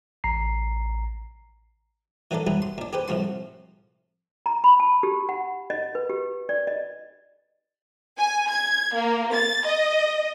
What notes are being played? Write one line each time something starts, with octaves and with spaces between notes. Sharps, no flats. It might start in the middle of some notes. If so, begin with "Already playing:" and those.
A1 A#5 C7
E3 F#3 A#3 D4 A4
B2 E3 F#3 G3 B4
C6
A#2 D4
G4 G#4 B4 C5
C2 A2 F3 F#4 C6
A#5
B5
A5
G4
F#5
D#5
B4
G4
D5
D#5
G#5
G#6
A#3
A6
D#5